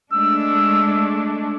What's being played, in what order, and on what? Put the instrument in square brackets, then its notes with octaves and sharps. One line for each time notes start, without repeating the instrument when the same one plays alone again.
[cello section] G#3 A3 D4 [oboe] E6